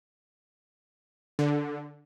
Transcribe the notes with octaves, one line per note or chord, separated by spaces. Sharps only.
D3